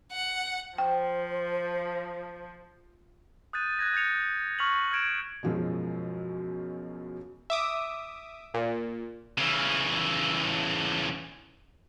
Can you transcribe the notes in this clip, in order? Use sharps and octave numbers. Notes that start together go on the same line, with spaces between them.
F#5
F3 C5 G5
D#6 F#6 G6 A6 D#7
F#6 G#6 A#6
D#6 G6 A6 A#6 C#7 F7
C#6 F6 B6 F7 F#7
F6 G6 G#6 D7 E7
F#2 B2 F3 F#3 G#3
E5 D6 D#6
A#2
C#3 E3